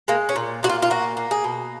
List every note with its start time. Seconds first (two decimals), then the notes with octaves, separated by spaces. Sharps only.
0.08 G#3 A#3
0.29 C#4
0.36 A#2
0.63 A#2 F#4
0.69 F4
0.82 F4
0.90 A#3 F#4
1.17 A#3
1.31 G#4
1.44 B2